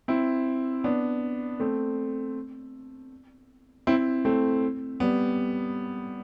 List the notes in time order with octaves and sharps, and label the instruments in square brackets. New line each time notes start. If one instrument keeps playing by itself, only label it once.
[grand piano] C4 E4
B3 D4
A3 C4
C4 E4
A3 C4
G3 B3